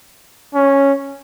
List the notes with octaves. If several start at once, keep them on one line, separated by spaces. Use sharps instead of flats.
C#4